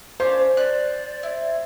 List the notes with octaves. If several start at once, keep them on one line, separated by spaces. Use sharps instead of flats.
C#4 D4 C5 F5
D5 F#6
E4